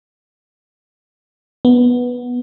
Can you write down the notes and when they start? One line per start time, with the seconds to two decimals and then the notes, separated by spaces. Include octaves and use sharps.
1.65 B3